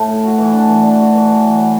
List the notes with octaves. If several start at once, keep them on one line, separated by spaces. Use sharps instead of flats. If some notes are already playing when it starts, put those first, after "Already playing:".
Already playing: A2 A3
E4
F#4
E3
D4
E3
D4
F#4
E3
E3
F#3
F#3